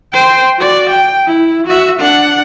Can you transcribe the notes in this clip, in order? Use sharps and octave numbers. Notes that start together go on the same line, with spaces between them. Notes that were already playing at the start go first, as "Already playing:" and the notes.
C5 G5
F#4 D5
G5
E4
F#4 E5
D4 F#5